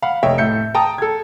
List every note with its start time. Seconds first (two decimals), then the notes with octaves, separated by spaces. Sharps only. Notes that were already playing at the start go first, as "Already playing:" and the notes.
0.02 F5 F#5 B5
0.23 F1 C#5 D#5 E5 G5
0.38 A2 E5 G6 C#7
0.75 G5 A5 A#5 D#6
0.98 A4 G#6